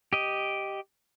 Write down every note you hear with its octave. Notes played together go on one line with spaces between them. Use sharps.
G4 D#5